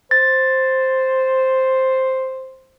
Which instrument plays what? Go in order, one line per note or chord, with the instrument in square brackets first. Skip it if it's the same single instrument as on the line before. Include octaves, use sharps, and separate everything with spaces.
[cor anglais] C5 [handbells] A6